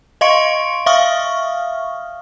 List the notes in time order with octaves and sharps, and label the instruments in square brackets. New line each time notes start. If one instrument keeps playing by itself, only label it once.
[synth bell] D#5 F5 C6 C#6 C#7 D7
E5 F5 C#6 D#6 F6